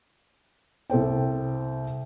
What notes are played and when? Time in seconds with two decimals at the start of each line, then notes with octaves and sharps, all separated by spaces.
0.90 C2 A4 C5 G5